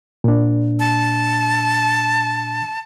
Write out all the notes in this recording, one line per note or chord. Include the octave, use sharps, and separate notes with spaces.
A#2 D4
A5